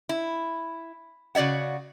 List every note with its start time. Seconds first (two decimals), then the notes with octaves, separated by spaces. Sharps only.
0.09 E4
1.35 C#3 F#4 D5 E5 F#5